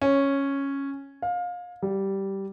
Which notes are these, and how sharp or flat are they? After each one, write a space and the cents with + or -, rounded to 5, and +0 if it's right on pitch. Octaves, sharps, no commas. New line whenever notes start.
C#4 -5
F5 +25
G3 -10